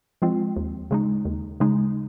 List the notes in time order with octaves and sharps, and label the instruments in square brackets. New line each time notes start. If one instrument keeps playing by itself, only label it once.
[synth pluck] F3 G#3 C4 F4
D#2
C#3 G#3 D#4
D#2
C#3 G#3 D#4